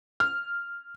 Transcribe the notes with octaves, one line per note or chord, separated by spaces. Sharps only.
F6